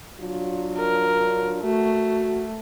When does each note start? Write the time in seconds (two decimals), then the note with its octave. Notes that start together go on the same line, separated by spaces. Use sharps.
0.21 F#3 D4 F4
0.78 A#4
1.63 A3 F#4